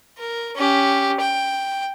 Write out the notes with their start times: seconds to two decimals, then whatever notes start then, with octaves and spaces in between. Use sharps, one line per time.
0.18 A#4
0.56 C#4 G4
1.20 G5